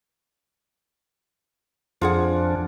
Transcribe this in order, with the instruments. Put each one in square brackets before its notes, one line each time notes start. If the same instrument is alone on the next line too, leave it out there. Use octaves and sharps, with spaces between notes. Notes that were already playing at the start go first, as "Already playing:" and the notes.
[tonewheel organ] F2 F3 D4 [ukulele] F4 G#4 F#5